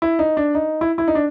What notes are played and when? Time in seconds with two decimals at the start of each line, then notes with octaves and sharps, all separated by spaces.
0.02 E4
0.19 D#4
0.37 D4
0.55 D#4
0.81 E4
0.98 E4
1.08 D#4
1.15 D4